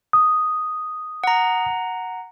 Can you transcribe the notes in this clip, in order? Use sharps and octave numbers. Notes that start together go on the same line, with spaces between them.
D#6
F#5 A#5